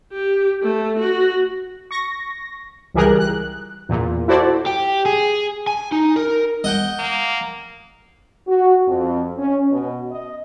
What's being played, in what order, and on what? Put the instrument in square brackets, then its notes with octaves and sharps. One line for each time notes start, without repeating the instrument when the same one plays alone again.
[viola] G4
A3
F#4
[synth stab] C#6 A#6
C#2 E3 G3 G#4 A#4 F#6
F#6
E2 A#2
E4 F#4 A4 C5 D5
[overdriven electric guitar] G4
G#4
G#5
D#4
A#4
[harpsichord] D#5 F#5 G5
[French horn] A#3
[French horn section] F#4
F2
C#4
B2
D#5